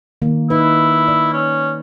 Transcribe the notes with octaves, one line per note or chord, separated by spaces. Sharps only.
D#3 A#3
D#4 E4 B4
D5
C#4